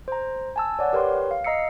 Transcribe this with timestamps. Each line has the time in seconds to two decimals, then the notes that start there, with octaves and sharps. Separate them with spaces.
0.08 C5 A#5
0.56 G#5 A5 E6
0.79 C#5 D5 F#5
0.93 G4 A#4 B4 C#5 G5 C6
1.31 F5
1.44 D#5 A#5 E6 C7 C#7